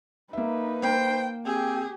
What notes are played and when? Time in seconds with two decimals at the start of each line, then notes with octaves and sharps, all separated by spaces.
0.33 A#3 D#4 B4 E5
0.83 A#3 C5 G5
1.46 C4 G4 G#4